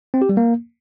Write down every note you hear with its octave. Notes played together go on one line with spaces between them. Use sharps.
C4
G4
G3
A#3